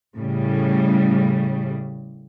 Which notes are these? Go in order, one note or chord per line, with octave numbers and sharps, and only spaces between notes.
A2 C#3 G3